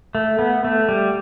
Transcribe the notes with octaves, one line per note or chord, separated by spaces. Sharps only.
A3
B3
A3
G3